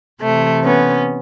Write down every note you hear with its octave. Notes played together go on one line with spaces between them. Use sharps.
C3 E3 A3
B3 C#4